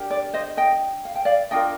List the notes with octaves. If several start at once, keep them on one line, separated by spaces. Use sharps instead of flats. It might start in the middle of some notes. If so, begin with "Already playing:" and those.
Already playing: D4 G4 A#4
D5
C5 D#5
D#5 G5
F5
G5
D5 F5
D4 F4 A#4 D#5 G5